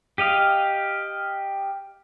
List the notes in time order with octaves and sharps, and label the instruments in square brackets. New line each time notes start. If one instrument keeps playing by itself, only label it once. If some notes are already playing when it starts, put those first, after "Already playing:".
[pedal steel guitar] G4 D#5 F5